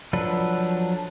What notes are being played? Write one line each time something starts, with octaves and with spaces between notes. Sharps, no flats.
F3 F#3 D4 A4 B4